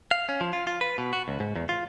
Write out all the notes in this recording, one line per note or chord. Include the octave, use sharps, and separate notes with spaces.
F5
C#4
F3
F4
F4
B4
B2
F#4
C#2
G#2
E2
F4